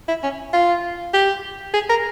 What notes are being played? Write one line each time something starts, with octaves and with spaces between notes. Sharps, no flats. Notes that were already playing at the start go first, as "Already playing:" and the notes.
E4
C#4
F4
G4
G#4
A#4